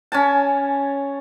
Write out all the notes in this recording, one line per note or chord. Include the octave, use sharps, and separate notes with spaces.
C#4 G#5 A5